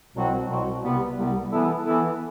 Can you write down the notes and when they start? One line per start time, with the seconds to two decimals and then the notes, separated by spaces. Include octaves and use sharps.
0.14 C2 B2 F#3 C4 F#4
0.48 C2 B2 F#3 C4 F#4
0.82 C2 C3 G3 B3
1.17 C2 C3 G3 B3
1.51 E3 B3 E4 A4
1.86 E3 B3 E4 A4